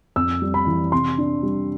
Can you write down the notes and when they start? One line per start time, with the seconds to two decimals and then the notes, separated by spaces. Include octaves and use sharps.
0.16 F2 E6
0.42 G3
0.54 B5
0.67 E3
0.92 C3 C6
1.18 D4
1.43 G3